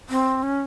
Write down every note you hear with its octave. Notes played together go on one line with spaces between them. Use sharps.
C4
C#4